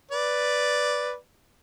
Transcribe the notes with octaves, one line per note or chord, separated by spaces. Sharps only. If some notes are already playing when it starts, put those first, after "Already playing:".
B4 D5